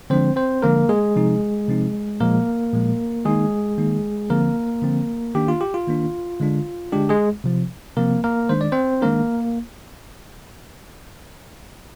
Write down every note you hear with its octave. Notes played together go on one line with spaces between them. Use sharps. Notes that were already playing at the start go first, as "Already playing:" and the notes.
D3 F3 G#3 C4 D4 C5
C4 C5
D3 F3 G#3 A#3 D4 A#4
G#3 G#4
C3 F3 C4 D#4
C3 F3 C4 D#4
A#2 F3 G#3 A#3 A#4
A#2 F3 G#3
D#3 G#3 A#3 D#4 G#4
D#3 A#3 D#4
D3 F3 A#3 C4 A#4
D3 F3 C4
D#3 A#3 D4 G4
F4
G4
F4
D#3 A#3 D4
D3 G#3 D4
D3 G#3 D4 G4
G#3 G#4
C3 F3 C4
C3 F3 A#3 C4 A#4
A#3 A#4
D#3 G#3 D4 C5
D5
C4 C5
D#3 G#3 A#3 D4 A#4